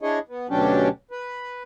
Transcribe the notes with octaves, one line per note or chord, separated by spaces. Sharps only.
D4 E4 G#4 C#5 D#5
B3
D2 B2 F#3 C#4 D4 G4
B4